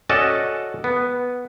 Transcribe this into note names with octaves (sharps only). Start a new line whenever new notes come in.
C#4 F#4 A4 D5 D#5 A5
B3